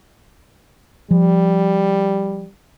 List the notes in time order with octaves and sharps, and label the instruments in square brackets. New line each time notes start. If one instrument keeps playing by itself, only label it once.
[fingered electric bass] F3 [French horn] G3